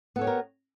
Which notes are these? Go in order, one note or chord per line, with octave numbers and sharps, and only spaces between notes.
B3 G4 A4 A#4 C#5